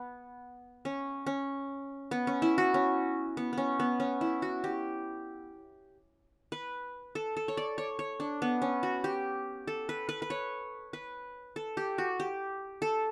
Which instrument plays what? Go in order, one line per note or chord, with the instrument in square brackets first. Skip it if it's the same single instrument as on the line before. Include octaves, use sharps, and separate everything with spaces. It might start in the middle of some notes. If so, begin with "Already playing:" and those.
Already playing: [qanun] B3
C#4
C#4
B3
C#4
E4
F#4
C#4
B3
B3 C#4
B3
C#4
E4
F#4
G4
B4
A4
A4
C#5
D5
C#5
C#5
D4
B3
C#4
F#4
G4
A4
B4
B4
B4
C#5
B4
A4
G4
F#4
G4
A4